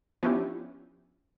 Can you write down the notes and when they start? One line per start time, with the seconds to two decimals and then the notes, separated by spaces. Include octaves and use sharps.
0.23 F3 B3 C#4 D4 E4 G4